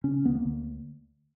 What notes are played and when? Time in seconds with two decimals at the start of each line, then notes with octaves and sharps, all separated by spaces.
0.04 C#3 C#4
0.25 D2 B3
0.35 A#3
0.45 D2